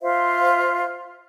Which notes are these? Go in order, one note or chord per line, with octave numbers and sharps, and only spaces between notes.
F4 C5 E5 F5